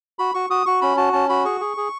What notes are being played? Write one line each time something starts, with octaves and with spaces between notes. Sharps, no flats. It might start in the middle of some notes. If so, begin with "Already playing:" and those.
F#4 B5
F#4 C#6
F#4 D#6
F#4 C#6
C#4 B5
F#4 A5
C#4 A5
F#4 B5
G#4 C#6
G#4
G#4